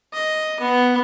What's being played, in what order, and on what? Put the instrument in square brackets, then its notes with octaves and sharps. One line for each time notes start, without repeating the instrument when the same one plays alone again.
[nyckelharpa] D#5
B3